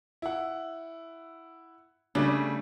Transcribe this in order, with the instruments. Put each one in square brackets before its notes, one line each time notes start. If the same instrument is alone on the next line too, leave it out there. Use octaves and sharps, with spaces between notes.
[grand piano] E4 F#5
[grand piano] C#3 G3 A3 [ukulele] D4